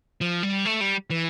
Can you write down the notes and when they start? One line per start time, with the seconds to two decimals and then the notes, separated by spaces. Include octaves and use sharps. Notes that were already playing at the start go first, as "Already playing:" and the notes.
0.21 F3
0.43 G3
0.65 A3
0.81 G3
1.10 E3